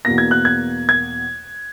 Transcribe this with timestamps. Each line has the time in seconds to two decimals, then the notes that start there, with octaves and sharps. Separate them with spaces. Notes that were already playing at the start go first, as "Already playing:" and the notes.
0.05 E2 B2 A#3 A#6
0.18 G#6
0.31 F#6
0.45 G#6
0.89 G#6